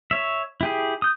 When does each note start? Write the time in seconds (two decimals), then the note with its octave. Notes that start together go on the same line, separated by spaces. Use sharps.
0.11 C#5 E5
0.61 E4 G4 G#4
1.02 D#6 G6